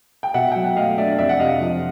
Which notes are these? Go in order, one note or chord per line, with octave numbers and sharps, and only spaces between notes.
G5
B2 E5 F#5
F#3 G5
F#5
A3 D#5 F5
D4 D5 E5
F2 D5 E5
F#5
C3 D#5 F5
F3